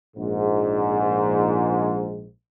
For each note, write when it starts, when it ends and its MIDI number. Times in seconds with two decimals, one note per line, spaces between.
0.17 2.28 34
0.17 2.28 44